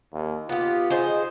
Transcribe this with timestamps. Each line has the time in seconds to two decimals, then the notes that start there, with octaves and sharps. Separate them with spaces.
0.13 D#2
0.49 B3 F4 G4
0.90 D#4 G#4 C5